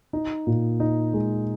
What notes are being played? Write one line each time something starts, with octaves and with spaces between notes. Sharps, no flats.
D#4
A#2
D#4
G#3